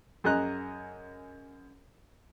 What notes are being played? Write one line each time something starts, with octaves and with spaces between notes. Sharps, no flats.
F#2 G#4 D#5 A#5 F#6